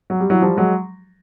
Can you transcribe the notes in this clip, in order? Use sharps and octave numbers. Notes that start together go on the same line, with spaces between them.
F#3
G3
E3 F#3
F3 G3
F#3 G#3